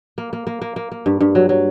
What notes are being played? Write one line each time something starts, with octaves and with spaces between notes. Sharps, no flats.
A#3
A#3
A#3
A#3
A#3
A#3
G2
G2
F#3
F#3